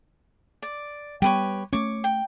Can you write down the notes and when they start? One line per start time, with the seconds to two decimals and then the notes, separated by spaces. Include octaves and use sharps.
0.62 D5
1.22 G3 B3 G4 B4 C#5
1.73 A3 C#4 C#5 D6
2.04 G5